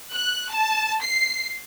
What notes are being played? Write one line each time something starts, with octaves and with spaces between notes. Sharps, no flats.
F#6
A5
C7